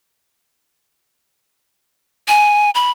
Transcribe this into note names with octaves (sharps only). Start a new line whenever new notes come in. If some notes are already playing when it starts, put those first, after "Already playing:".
G#5
B5